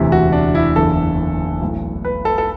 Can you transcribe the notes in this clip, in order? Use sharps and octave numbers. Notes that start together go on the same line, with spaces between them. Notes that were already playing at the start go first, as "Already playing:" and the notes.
Already playing: E1 D2 C3 E3
F#4
D4
E4
F#1 E2 D3 A4
B1 A2 E3
B4
A4
A4